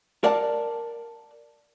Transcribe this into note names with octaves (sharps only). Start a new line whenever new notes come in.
A#4 D5 F5 F#5 A5